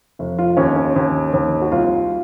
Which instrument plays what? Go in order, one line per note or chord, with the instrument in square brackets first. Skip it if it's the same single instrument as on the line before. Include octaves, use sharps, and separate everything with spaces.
[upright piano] F1
F4
D#2 C#4
C#4
D#2
D#2
F#4
C2 F4